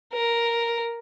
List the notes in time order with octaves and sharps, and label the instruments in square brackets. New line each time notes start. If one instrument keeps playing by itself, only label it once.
[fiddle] A#4